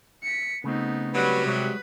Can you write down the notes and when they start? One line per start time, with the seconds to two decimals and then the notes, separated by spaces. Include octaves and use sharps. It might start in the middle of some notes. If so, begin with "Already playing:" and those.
0.23 B6 C#7
0.64 C#3 A3 B3 C4 D#4
1.14 F#3 G3 B4
1.46 C3 G#3 B4 C#5